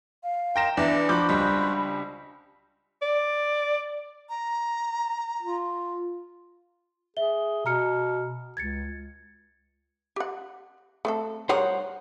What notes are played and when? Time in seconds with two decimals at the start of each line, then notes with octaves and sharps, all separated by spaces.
0.23 F5
0.56 D#4 A#4 G5 C6 A#6 E7
0.77 E2 D4 E5 A#5 D6
1.09 F3 F#4 C5 B5 D6 G6
1.29 C#2 G3
3.02 D5
4.29 A#5
5.42 F4
7.17 G#4 E5 G7
7.66 B2 A#5 F6 C#7
8.57 C#2 G#6 A6 C#7
10.16 G4 F#5
11.05 A3 C4 A4
11.49 G3 G#4 A#4 C5 C#5 F#5